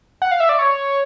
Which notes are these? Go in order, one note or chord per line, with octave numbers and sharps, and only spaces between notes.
F#5
F5
E5
D5
C#5